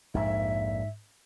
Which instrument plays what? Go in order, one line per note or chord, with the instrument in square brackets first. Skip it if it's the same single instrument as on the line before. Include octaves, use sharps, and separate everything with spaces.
[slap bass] A#1 F2 [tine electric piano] G#2 [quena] E5